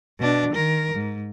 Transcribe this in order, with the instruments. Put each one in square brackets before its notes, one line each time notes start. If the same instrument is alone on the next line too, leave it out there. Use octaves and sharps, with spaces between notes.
[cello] B2 D4
D#3 A#4
G#2